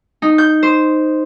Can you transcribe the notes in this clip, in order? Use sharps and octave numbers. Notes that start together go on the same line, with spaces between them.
D#4
G6
C5